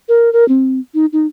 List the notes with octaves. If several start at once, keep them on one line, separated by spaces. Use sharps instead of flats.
A#4
A#4
C4
D#4
D#4